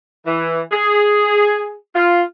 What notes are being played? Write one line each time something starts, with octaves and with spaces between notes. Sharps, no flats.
E3
G#4
F4